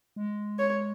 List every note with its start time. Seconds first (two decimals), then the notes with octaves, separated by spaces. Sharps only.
0.16 G#3
0.59 C#5